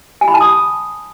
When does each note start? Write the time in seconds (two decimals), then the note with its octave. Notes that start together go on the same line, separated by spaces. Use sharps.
0.21 G#5
0.28 B5
0.34 A5
0.41 D#6